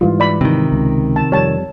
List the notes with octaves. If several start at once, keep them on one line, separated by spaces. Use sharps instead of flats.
G#2 E3 G3 F4
D5 B5
C3 D#3
C#2
A5
F2 G3 C#5 A5